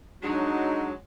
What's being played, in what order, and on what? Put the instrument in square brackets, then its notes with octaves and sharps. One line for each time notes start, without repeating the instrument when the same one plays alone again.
[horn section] F#3 G#3 [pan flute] D4 [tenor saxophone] D#4 [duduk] F#4